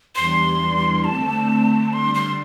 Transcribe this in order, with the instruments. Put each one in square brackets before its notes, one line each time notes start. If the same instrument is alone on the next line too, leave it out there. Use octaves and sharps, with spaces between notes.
[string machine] E2 E3 G3 D4 [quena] C6
[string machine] D3 A3 C4 [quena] A5
[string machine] D3 G3 D4 [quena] C6
[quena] C6